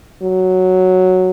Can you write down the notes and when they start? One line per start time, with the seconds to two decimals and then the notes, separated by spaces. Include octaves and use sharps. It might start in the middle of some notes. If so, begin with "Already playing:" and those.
0.22 F#3